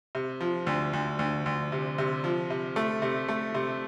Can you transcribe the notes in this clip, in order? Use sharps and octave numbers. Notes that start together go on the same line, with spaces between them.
C3
F3
D2
D2
D2
D2
C3
C3
F3
C3
A3
C3
A3
C3